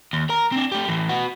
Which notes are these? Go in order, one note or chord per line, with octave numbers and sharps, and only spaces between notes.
D#2
A#4 A#5
C4 D4
A3 G4
A2 E3
B3 F#4